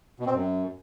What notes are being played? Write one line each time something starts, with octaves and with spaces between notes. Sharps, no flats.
B2
C4
F#2